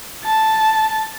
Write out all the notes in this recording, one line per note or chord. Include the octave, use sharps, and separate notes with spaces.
A5